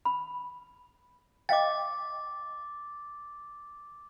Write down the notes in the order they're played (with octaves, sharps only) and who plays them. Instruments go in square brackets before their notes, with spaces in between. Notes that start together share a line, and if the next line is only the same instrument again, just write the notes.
[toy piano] B5
[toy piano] D#5 F5 G5 [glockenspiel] D6 A6